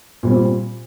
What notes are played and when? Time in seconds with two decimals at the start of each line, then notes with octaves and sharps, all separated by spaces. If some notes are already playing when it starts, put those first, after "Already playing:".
0.23 A#2 G3 C4